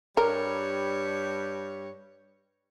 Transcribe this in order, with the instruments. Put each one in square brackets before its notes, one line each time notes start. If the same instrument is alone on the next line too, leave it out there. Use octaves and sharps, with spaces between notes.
[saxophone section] G2 G3 C#5 [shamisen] A#4